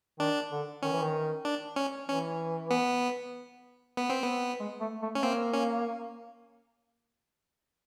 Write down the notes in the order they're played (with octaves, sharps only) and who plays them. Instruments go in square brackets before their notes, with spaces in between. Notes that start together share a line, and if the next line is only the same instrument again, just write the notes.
[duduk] D#3 [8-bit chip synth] D4
[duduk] D3
[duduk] D#3 [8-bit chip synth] C#4
[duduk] E3
D#3
[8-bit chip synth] D4
C#4
[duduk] E3 [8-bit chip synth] C#4
[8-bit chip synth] B3
B3
C4
B3
[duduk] G#3
A3
A3
[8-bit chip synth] C#4
[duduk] A#3 [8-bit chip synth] C4
[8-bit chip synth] C#4